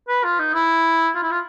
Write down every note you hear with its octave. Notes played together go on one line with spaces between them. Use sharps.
B4
F4
D#4
E4
F4
E4
F4